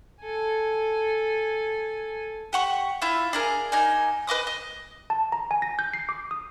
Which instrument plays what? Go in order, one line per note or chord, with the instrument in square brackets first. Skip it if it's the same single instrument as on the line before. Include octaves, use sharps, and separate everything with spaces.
[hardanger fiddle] A4 G#5
[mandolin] G4 F#5 C#6
E4 F4 E5
D4 G#4 A#4
A#3 D#4 G#5
B4 D#5 D6 D#6
D#5
[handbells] A5
A#5
G#5
A#6
G6
C7
D6
D#6